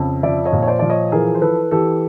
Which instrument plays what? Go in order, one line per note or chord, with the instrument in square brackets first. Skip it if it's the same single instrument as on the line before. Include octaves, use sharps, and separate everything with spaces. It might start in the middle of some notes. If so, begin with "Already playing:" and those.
Already playing: [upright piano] F2 C#3
F3 D5 E5
C#5 D#5
A#2
C#5
C5 D5
F3 D5
C#5 D#5
E3 G#4 A#4
C5
E3 A4 B4
E3 G4 A4